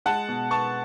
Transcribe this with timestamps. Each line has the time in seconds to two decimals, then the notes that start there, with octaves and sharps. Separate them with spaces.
0.06 G#3 F#5 A5
0.28 B2
0.50 B3 A5 C#6